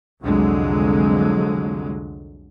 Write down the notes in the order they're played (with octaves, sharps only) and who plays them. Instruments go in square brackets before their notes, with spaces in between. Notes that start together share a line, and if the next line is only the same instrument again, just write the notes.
[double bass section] C2 F2 D3 F#3 G#3